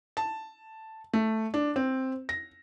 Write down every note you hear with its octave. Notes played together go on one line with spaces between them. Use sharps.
A5
A3
D4
C4
A#6